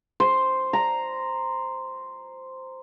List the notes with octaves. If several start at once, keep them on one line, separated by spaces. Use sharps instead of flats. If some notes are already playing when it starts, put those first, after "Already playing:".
C5
A#5